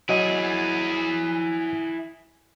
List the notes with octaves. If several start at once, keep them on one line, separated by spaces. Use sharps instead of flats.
F#3 E4 G#4 D#5